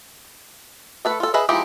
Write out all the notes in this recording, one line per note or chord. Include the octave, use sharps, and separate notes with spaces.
A3 A4 B4
F4 A4
G#4 B4 D#5 E5
E3 F3 G#3 D#4 G4